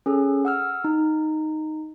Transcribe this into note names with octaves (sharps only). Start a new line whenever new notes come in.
C#4 G#4 A4
F#5 E6 F6
D#4